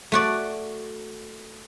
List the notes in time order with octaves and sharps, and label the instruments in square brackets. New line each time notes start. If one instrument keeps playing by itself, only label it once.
[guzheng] A3 F#4 D5